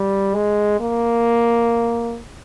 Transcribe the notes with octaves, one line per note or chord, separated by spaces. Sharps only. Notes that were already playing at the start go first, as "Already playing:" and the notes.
Already playing: G3
G#3
A#3